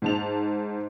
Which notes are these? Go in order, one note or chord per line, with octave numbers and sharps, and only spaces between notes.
G#2 A5 F7